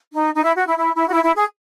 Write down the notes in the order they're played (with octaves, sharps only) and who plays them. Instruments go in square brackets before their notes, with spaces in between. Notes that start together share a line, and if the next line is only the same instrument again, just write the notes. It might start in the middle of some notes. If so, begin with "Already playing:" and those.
[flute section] D#4
D#4
E4
F#4
E4
E4
E4
F#4
E4
E4
G#4